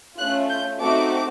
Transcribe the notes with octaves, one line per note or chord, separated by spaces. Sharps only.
A3 C#4 F4 F#6
G6
A3 C4 D#4 F#4 D6